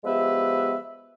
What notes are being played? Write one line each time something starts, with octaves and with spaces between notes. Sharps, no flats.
F3 G#3 B3 G4 B4 E5